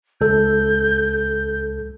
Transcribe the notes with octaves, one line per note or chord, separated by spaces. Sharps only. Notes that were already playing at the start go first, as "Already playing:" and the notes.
C#2 A4 G6